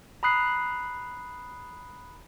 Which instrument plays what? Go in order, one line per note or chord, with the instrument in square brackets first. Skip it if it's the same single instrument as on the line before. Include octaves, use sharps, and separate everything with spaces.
[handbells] A#5 B5 D#6 F#6 C7